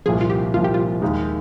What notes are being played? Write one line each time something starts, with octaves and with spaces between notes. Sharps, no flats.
C2 A#2 F3 G#4
F4
G4
C2 A#2 F3 F4
G4
F4
D#2 D#3 G#3 D#4